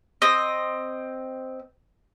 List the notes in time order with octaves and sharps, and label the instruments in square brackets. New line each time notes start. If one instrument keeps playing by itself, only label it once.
[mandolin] C4 D#5